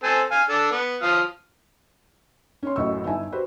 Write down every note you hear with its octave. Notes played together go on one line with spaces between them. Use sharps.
C4 A4 G#5
F5 G#5
D4 A4
B3
F3 F5 D#6
C#4 C#5 C6
A1 F#2 A2 D#5 C#6 E6
G1 D#4 E4 G#5 A5
F#4 G4 B4 C5